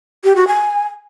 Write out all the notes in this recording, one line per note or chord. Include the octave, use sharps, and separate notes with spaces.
G4
F#4
G#5